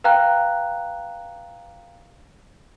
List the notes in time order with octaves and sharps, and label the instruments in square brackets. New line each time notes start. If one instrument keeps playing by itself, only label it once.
[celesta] B4 F5 G5 A#5 F#6